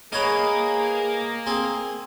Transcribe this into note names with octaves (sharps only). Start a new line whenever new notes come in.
A#3 G#4 A#4 B4 C#5 D#5
C4 G#4